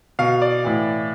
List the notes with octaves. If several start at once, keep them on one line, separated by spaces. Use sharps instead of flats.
B2 F5
D5
A2 E3